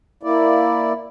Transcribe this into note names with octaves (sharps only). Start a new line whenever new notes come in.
A#3 E4 D5